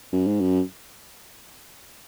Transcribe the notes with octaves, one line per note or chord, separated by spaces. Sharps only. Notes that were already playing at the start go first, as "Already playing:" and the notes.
F#2
G#2
F#2